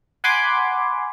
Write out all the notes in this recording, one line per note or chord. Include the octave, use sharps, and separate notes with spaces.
F#5 G#5 B5 C6 D6